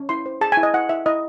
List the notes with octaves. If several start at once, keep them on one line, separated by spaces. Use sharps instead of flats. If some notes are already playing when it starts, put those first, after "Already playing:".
Already playing: C#4
E4 C6
C5
G#4 A5
G#5
E4
D#5
E4 F#5
E4 E5
E4 D#5